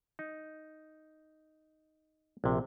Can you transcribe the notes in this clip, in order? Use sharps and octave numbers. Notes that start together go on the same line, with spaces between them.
D#4
A#1 C3